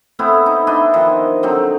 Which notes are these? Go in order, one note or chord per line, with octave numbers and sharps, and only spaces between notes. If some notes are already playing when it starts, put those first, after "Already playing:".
A3 B3 C4 E4
D#4
D4 E4 D#5 G#5
D#3 F3
D3 F#3 C4 D#4